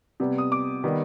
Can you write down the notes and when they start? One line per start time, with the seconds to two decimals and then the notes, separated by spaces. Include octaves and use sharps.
0.20 C3 G3 B3
0.38 D#6
0.52 D6
0.84 D#3 G3 B3